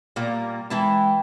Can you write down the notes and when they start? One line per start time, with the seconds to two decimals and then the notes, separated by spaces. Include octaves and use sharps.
0.16 A#2 G3 A#3
0.70 E3 G#3 E4 G5 A5